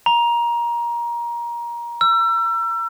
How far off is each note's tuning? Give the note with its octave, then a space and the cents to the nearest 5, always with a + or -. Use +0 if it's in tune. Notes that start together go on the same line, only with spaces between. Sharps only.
A#5 +20
E6 +35